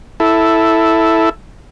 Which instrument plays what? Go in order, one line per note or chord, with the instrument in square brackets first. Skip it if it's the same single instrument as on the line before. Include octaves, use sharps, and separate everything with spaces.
[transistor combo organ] E4 A4